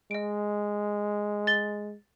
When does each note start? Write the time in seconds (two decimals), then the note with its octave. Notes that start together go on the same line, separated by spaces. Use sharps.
0.11 G#3 D#5 D7
1.47 A6 G7